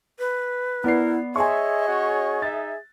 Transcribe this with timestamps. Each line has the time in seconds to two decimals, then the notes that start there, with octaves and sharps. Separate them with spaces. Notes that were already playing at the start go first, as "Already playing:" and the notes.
0.19 B4
0.84 B3 E4 A#4 D5 F#5 C7
1.36 G#4 C#5 D#5 E5 G#5 C6 C#6
1.87 C#4 F#4 C#5
2.42 D#4 E5 A6